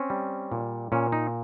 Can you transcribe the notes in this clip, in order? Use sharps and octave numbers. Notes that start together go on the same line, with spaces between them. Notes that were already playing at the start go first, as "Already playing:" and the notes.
Already playing: C4 C#4
G3
A#2
A#2 C#4
D#4